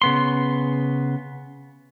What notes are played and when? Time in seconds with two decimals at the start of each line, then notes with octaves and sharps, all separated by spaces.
0.02 C#3 B3 C6